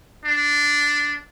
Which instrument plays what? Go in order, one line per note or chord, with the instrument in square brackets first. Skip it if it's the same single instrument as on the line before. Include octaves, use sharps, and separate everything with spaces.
[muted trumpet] D4